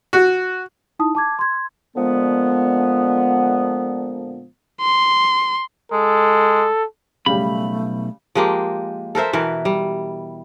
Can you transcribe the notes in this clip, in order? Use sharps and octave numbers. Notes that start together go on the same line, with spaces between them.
F#4
D#4 E4 A5 D#6
A5 D6 G#6
C6 G#6
A#2 D3 F3 G#3 B3
C6
G#3 A4
B1 C#3 G3 A3 G4 B5
F3 G#3 A#3 G4
A4 A#4 C5 E5
B2 E3 A#4
G3